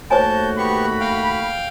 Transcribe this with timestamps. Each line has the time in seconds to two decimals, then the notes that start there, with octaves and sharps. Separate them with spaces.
0.11 D#2 A3 F#4 C5 C#5 G#5 A5 G6
0.58 B3 G4 B5 C#6
1.00 F5 G5